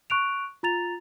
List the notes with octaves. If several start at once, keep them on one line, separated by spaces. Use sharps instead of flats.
C#6 F#6 D7 F7
F4 A#5 A6 F7